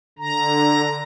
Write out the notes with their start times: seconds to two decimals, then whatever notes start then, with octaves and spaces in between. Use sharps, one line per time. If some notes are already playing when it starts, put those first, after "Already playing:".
0.19 D3 A#5